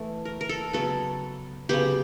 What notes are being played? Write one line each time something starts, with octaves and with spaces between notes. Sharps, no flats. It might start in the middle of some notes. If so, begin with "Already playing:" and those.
Already playing: E3 A3
A#4
A#4
A4
C#3 F#3 B3 A4
C#3 F#3 B3 G4